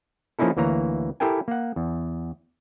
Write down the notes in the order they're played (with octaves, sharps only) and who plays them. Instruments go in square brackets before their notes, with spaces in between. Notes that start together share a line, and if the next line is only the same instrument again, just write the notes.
[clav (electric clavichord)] F3 A#3 C#4 D#4 E4 A4
D2 E3 A#3 C#5 A#5
E4 G4 A4 A#4 G5 G#5
A#3 F#5
E2